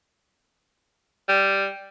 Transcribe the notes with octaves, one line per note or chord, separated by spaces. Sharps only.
G3